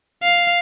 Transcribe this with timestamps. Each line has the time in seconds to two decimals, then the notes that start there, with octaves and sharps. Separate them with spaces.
0.23 F5